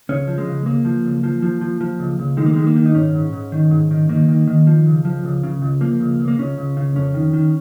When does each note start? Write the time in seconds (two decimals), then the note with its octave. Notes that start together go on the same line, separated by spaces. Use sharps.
0.09 C#2 C#4
0.27 F3
0.38 G#3
0.47 C#3
0.66 C#2 A#3
0.85 F3
1.04 C#2
1.23 F3
1.42 F3
1.61 F3
1.81 F3
1.99 C#2
2.19 C#2
2.37 D#3 G#3
2.46 A#3
2.53 D#3 G#3
2.67 A#3
2.76 D#3
2.86 D#4
2.95 G#2 C#4
3.14 G#2
3.33 G#2
3.52 D#3
3.71 G#2
3.91 D#3
4.09 D#3 A#3
4.28 D#3
4.47 D#3
4.67 F3
4.86 C#2
5.05 F3
5.24 C#2
5.43 C#3
5.62 C#2
5.81 F3 A#3
6.00 C#2
6.20 C#2
6.28 A#3
6.38 C#2 C#4
6.58 C#2
6.77 C#3
6.96 F2 C#4
7.14 D#3
7.33 D#3